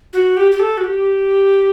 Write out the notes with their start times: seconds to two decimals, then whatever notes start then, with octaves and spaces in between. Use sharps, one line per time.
0.13 F#4
0.37 G4
0.52 G4
0.60 A4
0.78 F#4
0.84 G4